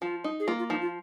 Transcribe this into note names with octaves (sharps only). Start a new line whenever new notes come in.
F3 F4
D#4
G#4
A#3 F4
F4
F3 D#4
F4